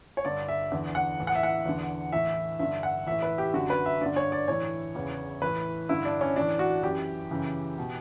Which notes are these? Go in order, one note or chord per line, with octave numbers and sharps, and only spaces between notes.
C#5
G2 D3 D5
E5
E2 D3
F#5
A2 E3
F#5
E5
F#5
E2 D3
A2 E3 E5
G2 D3 E5
F#5
A2 E3 E5
B4
G4
F#2 D3 F#4
B4
E5
G2 D3 D5
C#5
D5
A2 E3 C#5
E2 C#3 E3
A2 E3 B4
G2 D3 E4
D4
C#4
A2 E3 D4
F#4
F#2 E3 G4
F#2 C#3 E3
B2